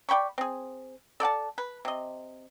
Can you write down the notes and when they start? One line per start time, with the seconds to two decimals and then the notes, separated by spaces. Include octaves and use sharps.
0.09 D5 G5 B5 C#6
0.38 C4 G#4
1.20 A4 D5 F#5 A5
1.58 B4
1.85 C3 D#5